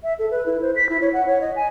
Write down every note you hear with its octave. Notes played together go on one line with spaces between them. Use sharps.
E5
A4
B4
E4
C5
B6
E4
C#5
F#5
C#5
D#5
G#5